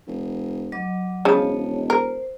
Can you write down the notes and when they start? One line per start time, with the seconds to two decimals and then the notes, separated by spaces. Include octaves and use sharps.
0.07 F1
0.72 F#3 D#5 D6
1.25 E1 C#3 F3 C#5 D#5 A5
1.90 A#4 C5